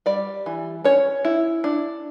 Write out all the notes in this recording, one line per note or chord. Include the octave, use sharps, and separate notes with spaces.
G3 D5
E3
C#4 C#5
E4
D4